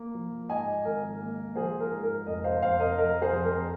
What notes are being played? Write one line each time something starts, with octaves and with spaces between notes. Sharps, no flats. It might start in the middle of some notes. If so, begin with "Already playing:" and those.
Already playing: A#3
F3
G#2 D#5 G#5
G#1 A#4
A#3
F3 G#4 C5
A#4
G#2
A#4
F1 A#4 D#5
C5 F5
F1 C5 F5
A#4 D#5
F3 A#4
G#4 C5
F2
A#4